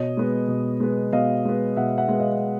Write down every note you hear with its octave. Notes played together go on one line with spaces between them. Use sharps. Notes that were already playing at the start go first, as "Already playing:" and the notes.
Already playing: B2 C#5 D#5
G#3 B3
B2
G#3 B3
B2 D#5 F5
G#3 B3
B2 E5 F#5
E5 F#5
G#3 B3
D#5 F5